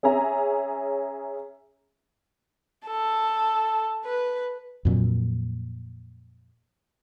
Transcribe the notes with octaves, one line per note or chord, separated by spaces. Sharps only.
C#4 G#4 E5 G#5 A#5
A4
B4
F2 A#2 F#3